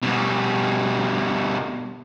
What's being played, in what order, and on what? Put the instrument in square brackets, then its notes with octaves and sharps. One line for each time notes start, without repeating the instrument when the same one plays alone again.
[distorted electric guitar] B2 G3